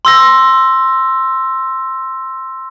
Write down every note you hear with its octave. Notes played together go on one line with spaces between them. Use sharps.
C6 E6 A#6